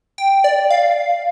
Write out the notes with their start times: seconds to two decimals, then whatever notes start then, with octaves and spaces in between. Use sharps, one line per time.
0.18 G5
0.44 D5
0.70 F5